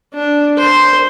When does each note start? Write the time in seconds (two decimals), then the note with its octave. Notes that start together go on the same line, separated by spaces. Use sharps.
0.14 D4
0.58 C5